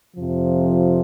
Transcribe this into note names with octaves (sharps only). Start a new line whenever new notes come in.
F2 C3 F3